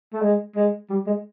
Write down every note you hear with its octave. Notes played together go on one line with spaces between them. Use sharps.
A3
G#3
G#3
G3
G#3